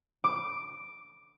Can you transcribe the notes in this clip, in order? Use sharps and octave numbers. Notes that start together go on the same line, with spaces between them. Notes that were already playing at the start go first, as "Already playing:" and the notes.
D6